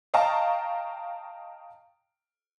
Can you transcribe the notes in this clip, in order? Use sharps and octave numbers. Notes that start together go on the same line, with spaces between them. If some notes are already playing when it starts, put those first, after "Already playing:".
D#5 F5 G5 A5 A#5 C#6